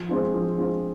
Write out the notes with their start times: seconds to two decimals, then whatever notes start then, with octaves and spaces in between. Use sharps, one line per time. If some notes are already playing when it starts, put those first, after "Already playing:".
Already playing: F3
0.09 G#3 C4 F4
0.34 F3
0.58 G#3 C4 F4